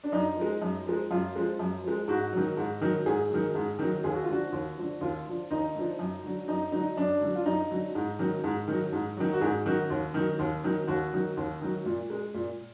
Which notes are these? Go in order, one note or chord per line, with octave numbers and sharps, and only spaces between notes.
D4
F#2 D#4
F3 G#3
F#2
F3 G#3
F#2 F4
F3 G#3
F#2
F3 G#3
G#2 F#4
D#3 F#3
G#2
D#3 F#3
G#2 G#4
D#3 F#3
G#2
D#3 F#3
D#2 G#4
F#4
F4
D3 F3 F#4
D#2
D3 F3
D#2 F4
D3 F3
D#2 D#4
D3 F3
F#2
D3 F#3
F#2 D#4
D3 F#3 D#4
F#2 D4
D3 F#3
F4
F#2 D#4
D3 F#3
G#2
D#3 F#3
G#2
D#3 F#3
G#2
D#3 F#3
F#4
G#2 G#4
D#3 F#3 F#4
D#2
D#3 F#3
D#2
D#3 F#3
D#2 F#4
D#3 F#3
D#2
D#3 F#3
A#2
G#3
A#2